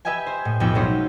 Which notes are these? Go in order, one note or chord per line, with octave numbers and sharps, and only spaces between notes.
G4 B4 D#5 E5 G5 G#5
C5
A2
B1 F2 B3 G5 E6
F#3 G#3 C#4 D#4 C5 C#5